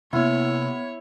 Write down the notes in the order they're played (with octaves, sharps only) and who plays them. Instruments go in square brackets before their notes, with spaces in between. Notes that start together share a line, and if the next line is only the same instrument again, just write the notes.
[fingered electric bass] C3 A#3 [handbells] B3 F6 [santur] E4 [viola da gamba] C#5